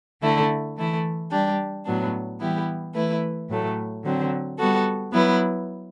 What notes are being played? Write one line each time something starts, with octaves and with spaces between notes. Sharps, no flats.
D3 A3 E4
E3 A3 E4
G3 D4 G4
A2 F#3 B3 D4
E3 G3 B3 E4 G4
E3 A3 E4 B4
A2 F#3 A3
D3 F#3 C4
G3 B3 F#4 A4
F#3 B3 E4 B4